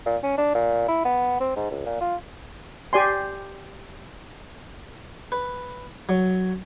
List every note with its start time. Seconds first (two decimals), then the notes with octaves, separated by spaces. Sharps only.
0.06 A#2
0.24 C#4
0.38 D4
0.55 A#2
0.89 E4
1.05 B3
1.40 C4
1.57 G#2
1.71 C#2
1.86 A#2
2.01 F4
2.93 G4 D5 G#5 C6
5.32 B4
6.09 F#3